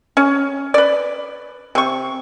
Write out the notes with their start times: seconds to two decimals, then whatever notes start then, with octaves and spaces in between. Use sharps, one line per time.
0.17 C#4
0.74 B4 D5
1.75 C3 C#6